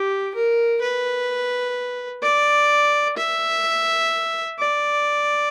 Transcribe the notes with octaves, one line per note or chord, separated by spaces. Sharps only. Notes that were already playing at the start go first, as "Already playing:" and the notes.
Already playing: G4
A#4
B4
D5
E5
D5